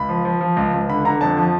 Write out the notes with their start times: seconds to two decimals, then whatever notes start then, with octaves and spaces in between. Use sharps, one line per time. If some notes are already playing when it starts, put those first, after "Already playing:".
Already playing: C#2 B5
0.09 F3
0.25 F3
0.41 F3
0.57 C#2
0.74 C#2
0.89 D3 B5
1.05 D3 A#5
1.21 F2 A5
1.37 F3